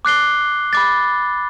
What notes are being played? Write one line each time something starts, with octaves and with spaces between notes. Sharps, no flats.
D6 F#6 C7 G7
B5 D6 A6